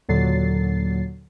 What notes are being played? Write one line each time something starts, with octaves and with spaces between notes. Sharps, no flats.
D#2 A#2 D3 F#3 A6 C7